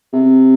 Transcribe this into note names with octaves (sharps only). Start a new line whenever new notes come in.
C3